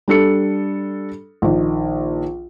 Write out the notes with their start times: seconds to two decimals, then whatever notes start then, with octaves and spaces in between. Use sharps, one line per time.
0.08 G3 D4 A4 C#7
1.42 A#1 D#3